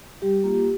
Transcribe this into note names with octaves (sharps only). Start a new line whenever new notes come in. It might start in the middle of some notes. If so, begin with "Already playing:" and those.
G3 G4
A#3 F4